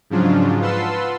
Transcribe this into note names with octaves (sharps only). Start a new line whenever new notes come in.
G#2 C#3 F3 F#3 D4 F4
F4 B4 F#5 A5 C6 E6